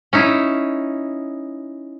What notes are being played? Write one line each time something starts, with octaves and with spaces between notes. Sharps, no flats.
C#4 D#4 E4